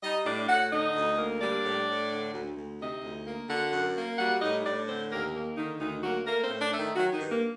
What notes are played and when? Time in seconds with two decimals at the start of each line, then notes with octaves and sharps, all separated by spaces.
0.03 G3 D#4 D#5
0.26 A2 D4 D5
0.49 A2 F#4 F#5
0.72 D3 D#4 D#5
0.95 D2
1.18 A#3
1.41 G3 D4 D5
1.65 A2
1.88 A2
2.11 D3
2.34 D2
2.57 D2
2.80 C3 D#4 D#5
3.03 D2
3.27 A#3
3.49 D3 F#4 F#5
3.72 F#2
3.96 A#3
4.18 G3 F#4 F#5
4.41 A2 D#4 D#5
4.65 A2 D4 D5
4.88 D3 C4 C5
5.11 D#2 A#3 A#4
5.34 A#3
5.57 D3 D#3 D#4
5.80 D2 D#3 D#4
6.03 F#3 A#3 F#4
6.26 A3 A#3 A#4
6.44 C4 C5
6.49 A2
6.61 D4 D5
6.73 A3
6.79 D#3 D#4
6.96 D#3 F#3 F#4
7.13 D#3 D#4
7.20 G2
7.31 A#3